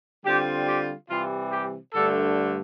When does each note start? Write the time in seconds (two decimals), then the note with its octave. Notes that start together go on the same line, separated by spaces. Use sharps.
0.24 D3 G3 C4 F4 G4
0.67 G4
1.09 C3 E3 G3 F4
1.51 G4
1.93 G2 D3 A3 A4